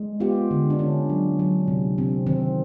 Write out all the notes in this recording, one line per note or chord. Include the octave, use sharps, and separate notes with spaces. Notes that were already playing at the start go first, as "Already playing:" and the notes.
Already playing: G#3
B3 F4 G4
D3
D4
D3 C#4
F#3
F#3
C3
C3 C4
D#3 C4